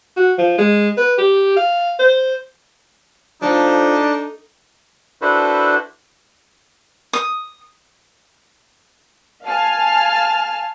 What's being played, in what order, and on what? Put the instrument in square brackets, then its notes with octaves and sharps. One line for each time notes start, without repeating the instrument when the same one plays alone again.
[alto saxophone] F#4
F3
G#3
B4
G4
F5
C5
[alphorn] F3 [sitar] A3 [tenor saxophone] D4 [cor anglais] D#4
[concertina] D4 E4 F#4 A4 B4 C5
[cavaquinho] D#6
[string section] F5 G#5 A5 F6